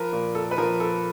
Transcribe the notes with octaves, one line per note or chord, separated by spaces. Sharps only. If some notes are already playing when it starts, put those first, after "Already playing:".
Already playing: F3 A#4 B4
A#2
A4
B4
F3 A#4
A4